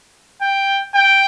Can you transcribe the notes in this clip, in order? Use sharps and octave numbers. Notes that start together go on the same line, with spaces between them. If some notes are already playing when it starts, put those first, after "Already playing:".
G5
G5